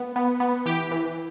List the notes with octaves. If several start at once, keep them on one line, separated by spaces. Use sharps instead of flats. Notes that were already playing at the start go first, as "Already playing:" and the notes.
Already playing: B3
B3
B3
E3 G4
E3